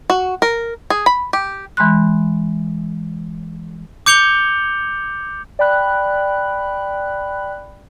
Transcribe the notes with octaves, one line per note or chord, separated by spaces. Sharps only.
F#4
A#4
G#4
B5
G4
E3 G#3 B5 C6 F#6
D6 G6 C#7 F7 G7
D5 G5 B5 F#6